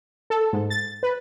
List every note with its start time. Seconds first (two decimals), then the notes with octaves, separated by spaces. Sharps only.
0.30 A4
0.53 G#2
0.70 A6
1.03 B4